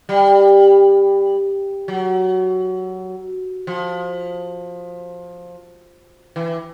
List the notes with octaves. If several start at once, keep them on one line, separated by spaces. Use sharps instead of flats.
G3
F#3
F3
E3